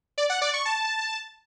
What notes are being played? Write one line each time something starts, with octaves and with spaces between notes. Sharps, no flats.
D5
F#5
D5
C#6
A5